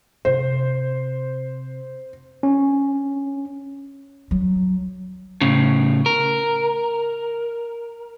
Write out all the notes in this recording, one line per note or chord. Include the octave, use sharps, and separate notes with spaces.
C3 C5
C#4
F#3
A2 C#3
A#4